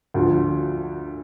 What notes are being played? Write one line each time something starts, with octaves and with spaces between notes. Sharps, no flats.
D2 D3 F3